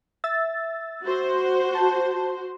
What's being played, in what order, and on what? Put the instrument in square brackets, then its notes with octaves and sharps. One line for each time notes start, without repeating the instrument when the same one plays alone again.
[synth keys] E5 E6 A6
[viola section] F#4 C5
[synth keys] A5